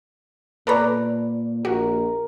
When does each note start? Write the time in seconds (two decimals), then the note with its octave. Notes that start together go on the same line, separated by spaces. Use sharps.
0.67 A#2 A4 B4 C#5 D5 A#5
1.65 A#1 F#4 A#4